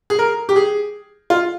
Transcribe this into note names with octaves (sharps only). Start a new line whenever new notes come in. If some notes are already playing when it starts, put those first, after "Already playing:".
G#4
A#4
G4
G#4
F4